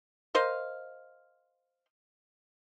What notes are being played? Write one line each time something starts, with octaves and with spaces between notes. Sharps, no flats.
A#4 C5 D#5 F5